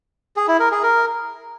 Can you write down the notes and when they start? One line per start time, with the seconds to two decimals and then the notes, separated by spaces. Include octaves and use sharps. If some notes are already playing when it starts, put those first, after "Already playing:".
0.36 G#4
0.48 E4
0.60 A#4
0.71 G#4
0.83 A#4